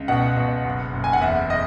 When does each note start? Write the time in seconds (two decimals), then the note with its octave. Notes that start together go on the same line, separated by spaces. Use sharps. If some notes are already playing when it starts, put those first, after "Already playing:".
Already playing: C#2
0.08 B2 F#5
0.37 B2
0.65 F#1
0.93 F#1
1.04 G#5
1.13 F#5
1.21 E2 E5
1.50 D#5